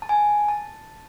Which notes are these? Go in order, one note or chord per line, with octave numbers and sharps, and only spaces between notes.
A5
G#5
A5